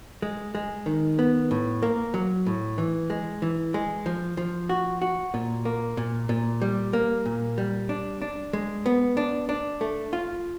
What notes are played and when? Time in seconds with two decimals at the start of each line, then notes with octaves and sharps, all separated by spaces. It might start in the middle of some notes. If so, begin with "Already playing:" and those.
0.22 G#3
0.55 G#3
0.86 D#3
1.19 B3
1.51 A2
1.83 A#3
2.14 F#3
2.47 A2
2.78 E3
3.10 G#3
3.42 E3
3.74 G#3
4.06 F3
4.37 F3
4.69 F#4
5.02 F#4
5.34 A#2
5.65 A#3
5.97 A#2
6.29 A#2
6.62 G3
6.93 A#3
7.26 A#2
7.58 G3
7.89 D4
8.22 D4
8.53 G#3
8.86 B3
9.17 D4
9.49 D4
9.81 A3
10.13 F4